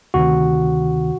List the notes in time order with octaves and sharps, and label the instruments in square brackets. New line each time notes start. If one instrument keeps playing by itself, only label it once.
[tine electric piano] D2 C3 D#3 F#4